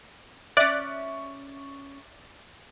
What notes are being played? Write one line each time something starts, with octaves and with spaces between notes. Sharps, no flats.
C#4 D5 E5 F#6